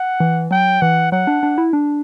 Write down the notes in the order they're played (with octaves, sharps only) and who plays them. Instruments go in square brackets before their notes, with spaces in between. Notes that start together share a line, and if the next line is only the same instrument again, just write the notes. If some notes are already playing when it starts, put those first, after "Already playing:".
Already playing: [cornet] F#5
[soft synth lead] E3
[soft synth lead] F#3 [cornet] G5
[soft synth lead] E3 [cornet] F#5
[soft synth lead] F#3 [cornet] F#5
[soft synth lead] D4
D4
E4
D4